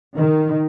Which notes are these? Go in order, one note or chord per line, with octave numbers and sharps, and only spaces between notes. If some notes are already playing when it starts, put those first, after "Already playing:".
D#3